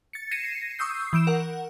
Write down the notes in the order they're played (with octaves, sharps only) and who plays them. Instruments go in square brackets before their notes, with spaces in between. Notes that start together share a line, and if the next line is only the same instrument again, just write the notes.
[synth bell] A6 C#7
G#6 A#6 C7 C#7 D#7 E7
C#6 D#6 E6 G6 C7
E3 G6 D7 E7
A#4 F#5